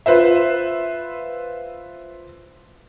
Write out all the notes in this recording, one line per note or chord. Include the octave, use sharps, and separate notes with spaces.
F4 B4 C5 E5